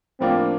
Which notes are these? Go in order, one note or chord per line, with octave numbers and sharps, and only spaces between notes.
A2 F3 A#3 C4 D4 F4